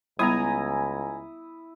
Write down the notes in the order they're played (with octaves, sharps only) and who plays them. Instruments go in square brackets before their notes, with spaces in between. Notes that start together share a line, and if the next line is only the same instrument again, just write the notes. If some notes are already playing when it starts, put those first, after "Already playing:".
[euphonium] C#2 [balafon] G3 B3 [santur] E4 D#6 [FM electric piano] G#5 A#5